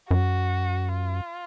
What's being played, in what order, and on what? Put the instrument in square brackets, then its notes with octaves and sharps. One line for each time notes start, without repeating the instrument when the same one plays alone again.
[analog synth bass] F#2 [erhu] F#4
[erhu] F4